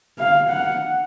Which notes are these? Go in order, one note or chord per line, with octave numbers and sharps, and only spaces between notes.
F5
F#5